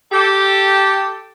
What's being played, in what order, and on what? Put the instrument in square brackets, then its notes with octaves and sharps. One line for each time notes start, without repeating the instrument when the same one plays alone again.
[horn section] G4 A4